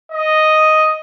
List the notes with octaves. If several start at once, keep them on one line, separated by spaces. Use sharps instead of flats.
D#5